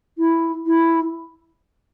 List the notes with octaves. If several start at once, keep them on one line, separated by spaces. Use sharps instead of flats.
E4
E4